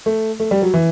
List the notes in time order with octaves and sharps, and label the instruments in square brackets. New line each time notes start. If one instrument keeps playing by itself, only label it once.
[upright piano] A3
A3
G3
F#3
E3